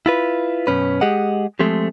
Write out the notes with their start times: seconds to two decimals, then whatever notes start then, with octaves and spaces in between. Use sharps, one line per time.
0.06 E4 F4 B4
0.67 F#2 B2 C#4 B4
1.01 G#3 G4 G#4 D#5 F#5
1.59 F3 G#3 A3 C4 G4